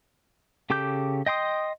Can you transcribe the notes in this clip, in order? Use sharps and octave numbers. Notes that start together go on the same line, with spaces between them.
C#3 G4 A4 D6 G6
D#5 G5 C6 D#6